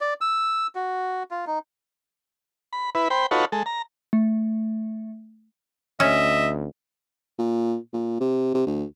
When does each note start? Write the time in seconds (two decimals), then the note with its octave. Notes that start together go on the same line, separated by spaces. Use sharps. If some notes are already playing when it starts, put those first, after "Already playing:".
0.01 D5
0.21 E6
0.75 F#4
1.31 F4
1.47 D#4
2.73 B5
2.95 E4 B4
3.10 C5 G5 B5
3.31 D#4 F4 F#4 A4 B4 C#5
3.52 G#3 A4
3.66 A#5
4.13 A3
6.00 D2 C#4 D#5 E5
7.38 A#2
7.93 A#2
8.20 C3
8.54 C3
8.66 D2